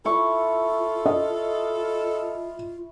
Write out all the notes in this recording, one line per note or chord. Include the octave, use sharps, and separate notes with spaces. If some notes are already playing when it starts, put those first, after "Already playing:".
E4 F4 A4 C#6
D#5